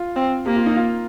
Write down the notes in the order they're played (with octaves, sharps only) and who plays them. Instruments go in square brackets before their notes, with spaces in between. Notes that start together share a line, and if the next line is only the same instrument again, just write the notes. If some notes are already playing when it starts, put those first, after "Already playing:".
Already playing: [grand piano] F4
[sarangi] C4
[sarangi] A#3 [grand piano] G4
[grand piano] F4
D#4
F4